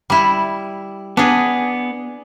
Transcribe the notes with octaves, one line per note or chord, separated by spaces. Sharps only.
G3 E4
B3 D4 G#4